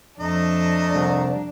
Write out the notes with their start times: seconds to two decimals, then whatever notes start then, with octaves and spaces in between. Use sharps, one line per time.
0.20 F2 A3 D4 D#5 A#5
0.95 C2